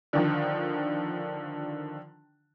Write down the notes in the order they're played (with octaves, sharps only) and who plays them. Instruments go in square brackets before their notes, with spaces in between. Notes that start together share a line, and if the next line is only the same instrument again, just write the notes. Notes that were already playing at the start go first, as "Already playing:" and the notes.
[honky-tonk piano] D3 D#3 F3